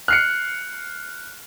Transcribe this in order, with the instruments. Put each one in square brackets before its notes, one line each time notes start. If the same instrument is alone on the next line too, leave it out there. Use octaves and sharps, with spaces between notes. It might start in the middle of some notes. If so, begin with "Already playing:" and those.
[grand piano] F6 C7 C#7 [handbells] F#6